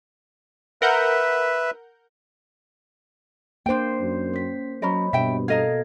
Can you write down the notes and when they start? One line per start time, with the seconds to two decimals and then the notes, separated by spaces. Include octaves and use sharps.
0.82 A#4 B4 E5 F#5 G6
3.66 A#3 D4 C5 G5
4.00 F#2
4.34 C#4 B6
4.82 F#3 C#4 A#4 C#5 D#5 B5
5.13 G2 B2 E5 G5
5.48 A4 A#4 D#5 F5 G#6